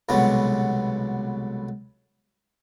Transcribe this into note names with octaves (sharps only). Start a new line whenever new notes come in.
C2 B2 D3 F#3 G#3 B3